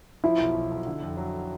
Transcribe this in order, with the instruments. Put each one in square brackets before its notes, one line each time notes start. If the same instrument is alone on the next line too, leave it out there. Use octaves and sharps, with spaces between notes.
[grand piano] F3 [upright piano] E4
[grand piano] B1
B1
B1
D3
F2
F#3